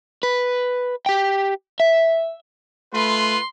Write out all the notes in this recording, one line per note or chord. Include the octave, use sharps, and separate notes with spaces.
B4
G4 G5
E5
A3 F4 B4 C6